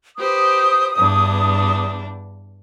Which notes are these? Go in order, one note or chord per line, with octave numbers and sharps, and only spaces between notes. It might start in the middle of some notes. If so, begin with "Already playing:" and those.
G4 B4 C5 D#6
E2 G2 D4